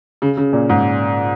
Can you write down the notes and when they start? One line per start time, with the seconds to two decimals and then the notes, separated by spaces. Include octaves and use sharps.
0.22 C#3
0.37 C#3
0.53 A#2
0.70 G#2